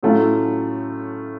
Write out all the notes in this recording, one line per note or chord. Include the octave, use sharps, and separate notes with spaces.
A2 F#3 A3 C#4 F4